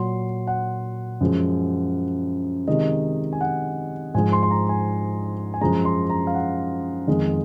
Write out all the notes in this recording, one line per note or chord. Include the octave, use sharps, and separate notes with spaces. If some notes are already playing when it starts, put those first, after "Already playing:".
Already playing: A#2 F#3 C6
F#5
F#2 F3 G#3
C3 D#3 G#3 D#5
G#5
F#5
G#2 F3 G#3 G#5
C6
C6
A#5
G#5
G#5
F#2 F3 G#3 A#5
C6
A#5
F5
F#5
F2 D#3 G#3